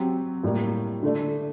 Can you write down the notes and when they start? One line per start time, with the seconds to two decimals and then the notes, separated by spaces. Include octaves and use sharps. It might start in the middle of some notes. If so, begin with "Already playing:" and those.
Already playing: F#3 C4 G4
0.44 A2 G3 A#3
1.03 D3 A3 D4